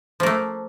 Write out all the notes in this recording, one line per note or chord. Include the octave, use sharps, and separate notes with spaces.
F3 A3 A#3